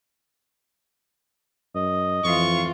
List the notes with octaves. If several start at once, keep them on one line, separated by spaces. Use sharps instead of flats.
F#2 D#5
F2 E3 F4 C#6